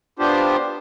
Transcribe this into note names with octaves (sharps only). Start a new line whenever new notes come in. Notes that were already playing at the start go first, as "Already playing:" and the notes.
B3 D4 F4 G4 C5